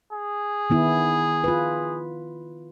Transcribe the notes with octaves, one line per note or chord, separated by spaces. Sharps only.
G#4
D#3 B3 E4
F4 B4